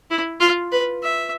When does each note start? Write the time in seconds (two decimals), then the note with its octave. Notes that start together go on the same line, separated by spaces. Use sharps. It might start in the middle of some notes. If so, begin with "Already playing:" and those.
0.10 E4
0.40 F4
0.72 B4
1.03 E5